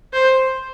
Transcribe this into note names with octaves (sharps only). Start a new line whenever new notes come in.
C5